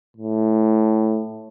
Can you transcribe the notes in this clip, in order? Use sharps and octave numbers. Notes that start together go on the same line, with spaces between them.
A2